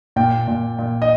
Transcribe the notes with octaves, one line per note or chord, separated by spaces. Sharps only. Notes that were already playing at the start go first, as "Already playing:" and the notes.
A#2 G5
A#2
A#2
D#5